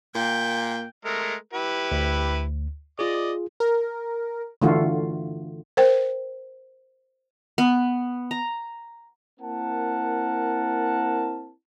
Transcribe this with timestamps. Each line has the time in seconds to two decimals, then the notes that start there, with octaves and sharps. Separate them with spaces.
0.15 A#2 A#3 G5
1.05 G#3 A3 A#4
1.53 E4 G4 B4
1.92 D2
2.99 F4 G#4 D5 D#5
3.60 A#4
4.62 D3 E3 A3 F4 F#4
5.77 A#4 C5 G5
7.58 B3
8.31 A#5
9.40 A#3 C4 E4 A#4 F#5 A5